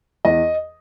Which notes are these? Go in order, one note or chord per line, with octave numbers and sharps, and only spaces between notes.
E2 D#5